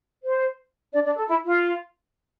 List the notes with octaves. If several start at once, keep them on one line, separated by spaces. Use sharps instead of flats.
C5
D4 D5
D4 D5
A4
E4
F4